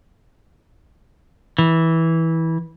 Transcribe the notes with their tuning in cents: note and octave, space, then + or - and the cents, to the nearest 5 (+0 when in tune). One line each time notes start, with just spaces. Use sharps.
E3 -15